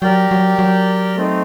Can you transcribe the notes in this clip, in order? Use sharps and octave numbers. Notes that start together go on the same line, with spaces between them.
F#3 G4 A#4 D5 G5
F#3
F#3
A3 C4 D#4